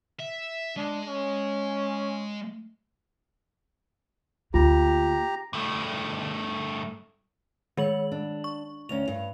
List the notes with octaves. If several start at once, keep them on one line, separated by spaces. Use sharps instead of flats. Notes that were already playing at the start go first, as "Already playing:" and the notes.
E5
G#3 D4
C#4
D2 A#3 F4 G4 A#5
G2 A3
D#3 G#3 C#5 F#7
D4
C#6
D2 C#4 F7
G2